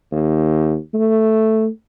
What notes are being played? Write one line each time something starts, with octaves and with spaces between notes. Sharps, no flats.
D#2
A3